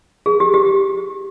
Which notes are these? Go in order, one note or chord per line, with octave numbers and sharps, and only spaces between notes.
G#4
G4
G4